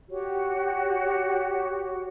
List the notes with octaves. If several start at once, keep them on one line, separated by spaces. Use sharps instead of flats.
F#4 G4 C#5